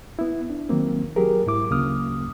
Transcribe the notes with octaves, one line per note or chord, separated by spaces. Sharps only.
B3 E4
D4
D#3 F#3 A#3 C4
F#3 G4 G#4 A#4
G#2 E4 D6
D2 C#3 F#3 A#3 D#6 F6